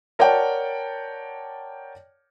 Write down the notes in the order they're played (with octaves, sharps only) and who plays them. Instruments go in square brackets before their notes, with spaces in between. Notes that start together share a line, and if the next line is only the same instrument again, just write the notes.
[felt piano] A#4 C#5 D5 F#5 G5 A5